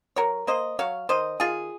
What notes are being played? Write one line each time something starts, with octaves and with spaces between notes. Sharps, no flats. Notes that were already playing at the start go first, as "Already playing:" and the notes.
F#3 A#4 C#5
A#3 C5 D#5
F#3 C#5 F5
D#3 C5 D#5
D#3 F4 G#4